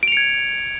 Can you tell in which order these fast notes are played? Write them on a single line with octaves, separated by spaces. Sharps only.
D7 F7 C#7 G#6